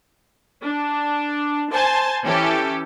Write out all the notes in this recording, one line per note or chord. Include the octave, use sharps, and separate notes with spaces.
D4
C5 G#5 A5
E3 C#4 G4 A4